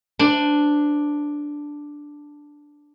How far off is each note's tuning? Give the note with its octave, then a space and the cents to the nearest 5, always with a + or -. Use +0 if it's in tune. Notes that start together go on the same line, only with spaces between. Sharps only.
D4 +0 C5 -25